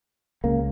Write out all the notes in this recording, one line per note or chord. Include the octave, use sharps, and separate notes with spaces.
C#2 C#3 A#3